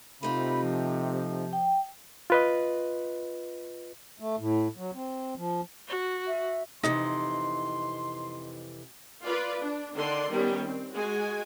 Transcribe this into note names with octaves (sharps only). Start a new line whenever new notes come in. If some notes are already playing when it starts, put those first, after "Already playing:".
C3 A3 D#4 F4 B5
F3
G5
F4 B4 D#5
A3
A2
F#3
C4
F3
F#4
E5
F2 C3 E3 D#4 C6
F4 B4 D5
D4
D3 D#3 D4 D5 C6
D#3 G3 B3 C#4
C4
G#3 F#4 G#5